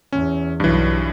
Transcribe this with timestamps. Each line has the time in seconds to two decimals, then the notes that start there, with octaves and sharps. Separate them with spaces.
0.12 E2 C#4
0.60 B1 G2 E3